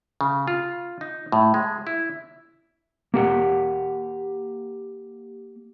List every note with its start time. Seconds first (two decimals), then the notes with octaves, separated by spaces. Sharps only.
0.21 C#3
0.48 F4
1.01 D#4
1.32 A2
1.54 G#3
1.87 E4
3.14 A#3 G4 F#5